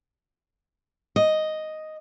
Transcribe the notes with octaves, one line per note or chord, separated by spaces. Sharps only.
D#5